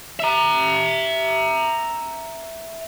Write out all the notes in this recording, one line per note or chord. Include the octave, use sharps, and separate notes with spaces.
E5 A#5